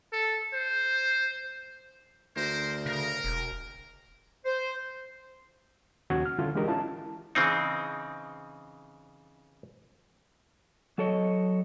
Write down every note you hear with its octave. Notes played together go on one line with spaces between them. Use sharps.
A4
C5
D2 C4 A#4 C5
C#3 A#4
E1
C5
D#2 C#3 C#4 F#4 F#5 G#6
F6
D3 G3 C#4 E4 F4 A4
E3 G#3 D4 G4 A#4 D#5
C#4 E4 F4 A5
C#3 E3 C4 D#4
F#3 A4 C#5 D#5